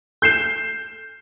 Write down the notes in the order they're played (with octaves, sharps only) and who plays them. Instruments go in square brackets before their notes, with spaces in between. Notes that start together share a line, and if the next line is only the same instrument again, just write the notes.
[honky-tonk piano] G6 C7 E7